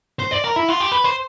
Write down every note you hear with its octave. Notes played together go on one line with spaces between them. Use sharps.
C5
D5
A#4
E4
F4
G4
B4
C5